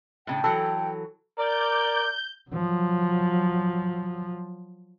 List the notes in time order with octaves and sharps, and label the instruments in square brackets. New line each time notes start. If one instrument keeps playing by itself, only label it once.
[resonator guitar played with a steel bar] A2 C#3 D4 [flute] G5
[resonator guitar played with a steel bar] E3 F#3 [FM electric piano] A4
[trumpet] A#4 [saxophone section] D5 [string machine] G6
[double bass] F3 F#3